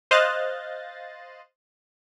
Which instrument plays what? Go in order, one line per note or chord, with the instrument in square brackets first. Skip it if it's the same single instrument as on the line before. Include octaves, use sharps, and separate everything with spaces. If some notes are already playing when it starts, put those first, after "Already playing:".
[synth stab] C5 D#5 F5 F#6 A6